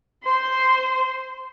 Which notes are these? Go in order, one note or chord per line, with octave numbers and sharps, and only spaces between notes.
C5 C6